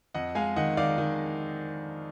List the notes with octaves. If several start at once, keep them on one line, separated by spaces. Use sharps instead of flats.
F2 D#5 F#5
G#3 F5 G#5
D#3 D#5 F#5
D#3 D5 F5
D#3